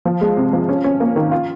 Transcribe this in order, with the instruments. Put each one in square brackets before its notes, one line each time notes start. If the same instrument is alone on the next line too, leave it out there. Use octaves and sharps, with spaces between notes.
[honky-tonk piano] F3
G#3
C3
F3
C#4
C#4
A#3
D#3
F4